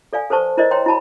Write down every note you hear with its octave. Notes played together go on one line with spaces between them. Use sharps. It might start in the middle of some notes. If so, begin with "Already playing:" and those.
A4 D5 F5 G#5
A4 B4 C5 A5 C#6
E4 A#4 C5 D5 D#5
C#5 G5 A#5 C6
E4 F#4 A5 B5